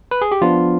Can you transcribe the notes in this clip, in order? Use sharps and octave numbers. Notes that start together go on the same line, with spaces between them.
B4
G#4
G4
F3 B3 D4 F4